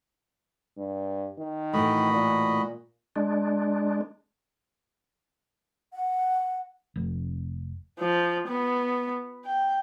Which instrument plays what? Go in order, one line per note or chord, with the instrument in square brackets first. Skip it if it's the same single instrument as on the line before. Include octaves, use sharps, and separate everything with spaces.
[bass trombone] G2
D#3
[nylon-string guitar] A2 E3 A3 [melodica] F#4 D#5 B5
[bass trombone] A#2
[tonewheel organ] G#3 D4
[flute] F#5
[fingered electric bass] F1
[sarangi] F3
B3
G5